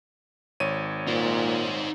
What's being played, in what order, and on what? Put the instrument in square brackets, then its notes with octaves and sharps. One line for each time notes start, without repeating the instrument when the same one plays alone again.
[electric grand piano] G#1 C#5 D#7
[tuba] A#2 [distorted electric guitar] D#4 C5